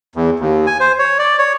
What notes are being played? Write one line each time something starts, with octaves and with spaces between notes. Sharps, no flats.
E2
D#2
G#5
C5
C#5
D5
C#5